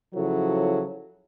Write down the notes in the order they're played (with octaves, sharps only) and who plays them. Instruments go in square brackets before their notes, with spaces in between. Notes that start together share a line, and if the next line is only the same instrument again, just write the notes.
[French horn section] C#3 F3 F#3 E4 A4